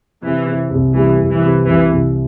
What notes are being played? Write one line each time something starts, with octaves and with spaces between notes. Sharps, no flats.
C3 E3
C3
C2
E3 G3
C2
E3
C3
C2 E3
C2